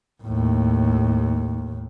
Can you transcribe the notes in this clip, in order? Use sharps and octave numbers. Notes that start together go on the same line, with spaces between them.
D#2 A2